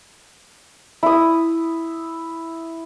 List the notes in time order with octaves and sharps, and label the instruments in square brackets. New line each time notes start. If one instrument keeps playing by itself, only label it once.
[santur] E4 D#6